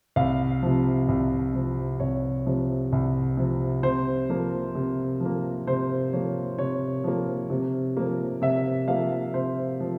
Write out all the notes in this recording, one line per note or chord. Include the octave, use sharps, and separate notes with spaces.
C2 F5
C3 F3
C2
C3 F3
C2 C#5
C3 F3
C2
C3 F3
C3 C5
F3 A#3
C3
F3 A#3
C3 C5
F3 A#3 C#5
C3 C#5
F3 A#3
C3
F3 A#3
C3 E5
F3 A#3 F5
C3 C5
F3